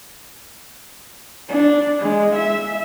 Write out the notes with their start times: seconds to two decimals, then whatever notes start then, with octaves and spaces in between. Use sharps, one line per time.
1.49 D4
2.00 G#3
2.35 E5